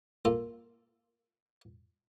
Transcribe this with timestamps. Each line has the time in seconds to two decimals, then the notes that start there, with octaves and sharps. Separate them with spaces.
0.25 A#3 F4 A4